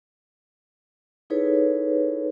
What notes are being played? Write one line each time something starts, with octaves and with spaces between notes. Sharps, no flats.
D#4 E4 G#4 A4 B4 C#5